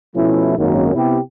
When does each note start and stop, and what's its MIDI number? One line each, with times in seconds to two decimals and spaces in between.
0.15 0.58 47
0.15 0.58 53
0.15 0.58 57
0.15 0.58 61
0.15 0.58 64
0.58 0.94 32
0.58 0.94 42
0.58 0.94 51
0.58 0.94 54
0.58 0.94 58
0.58 0.94 61
0.95 1.19 48
0.95 1.19 59
0.95 1.19 64
0.95 1.19 67